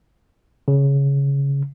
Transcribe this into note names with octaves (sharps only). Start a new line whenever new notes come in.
C#3